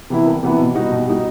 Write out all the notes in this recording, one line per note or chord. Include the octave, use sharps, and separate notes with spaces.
C3 E3 B3 E4
C2
C3 E3 B3 E4
B2
G3 D#4 F#4
B2
G3 D#4 F#4